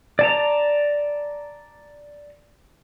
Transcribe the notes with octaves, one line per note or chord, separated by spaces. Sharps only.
D5 A5 A#5